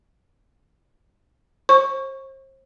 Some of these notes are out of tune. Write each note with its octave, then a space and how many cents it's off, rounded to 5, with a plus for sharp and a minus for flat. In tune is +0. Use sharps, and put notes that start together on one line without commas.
C5 +40 C#6 +0